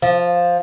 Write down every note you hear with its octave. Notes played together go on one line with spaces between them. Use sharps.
F3